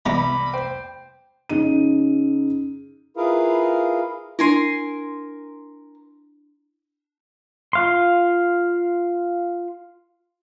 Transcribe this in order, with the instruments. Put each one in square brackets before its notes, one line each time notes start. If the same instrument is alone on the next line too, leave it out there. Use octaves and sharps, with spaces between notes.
[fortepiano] C2 A#5 [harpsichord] E3 G#3 B3 [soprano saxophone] B5 [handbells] D6
[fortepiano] C5 [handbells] G5
[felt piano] C#3 D#4 D#7
[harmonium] E4 F4 G#4 A#4 B4 F5
[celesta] D4 E4 [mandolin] A#4 G#5 C6
[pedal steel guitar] F4 F5 C6